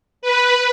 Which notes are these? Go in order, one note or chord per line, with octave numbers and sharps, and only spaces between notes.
B4